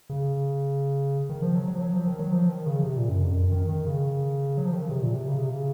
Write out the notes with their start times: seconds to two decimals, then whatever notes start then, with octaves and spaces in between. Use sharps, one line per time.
0.10 C#3
1.29 D#3
1.42 F3
1.55 F#3
1.68 F#3
1.75 F3
1.81 F#3
1.94 F3
2.07 D#3
2.19 F#3
2.32 F3
2.49 D#3
2.66 C#3
2.83 C3
2.97 A#2
3.09 F#2
3.22 F2
3.34 F#2
3.52 D#3
3.69 D#3
3.86 C#3
4.58 F#3
4.65 F3
4.73 D#3
4.81 C#3
4.89 C3
5.02 A#2
5.14 C3
5.28 C#3
5.38 C3
5.49 C#3